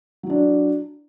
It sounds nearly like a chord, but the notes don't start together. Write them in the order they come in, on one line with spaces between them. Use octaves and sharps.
F#3 E4 D4